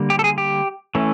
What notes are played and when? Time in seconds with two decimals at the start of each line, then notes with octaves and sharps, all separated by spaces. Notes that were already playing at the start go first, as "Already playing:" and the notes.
Already playing: D3 G3 A#3
0.10 G4
0.19 A4
0.24 G#4
0.38 G4
0.95 E3 A3 C#4